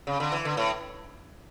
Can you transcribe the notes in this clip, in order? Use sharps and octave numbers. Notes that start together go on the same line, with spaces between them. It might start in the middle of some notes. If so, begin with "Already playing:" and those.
C#3
D3
E3
D3
A2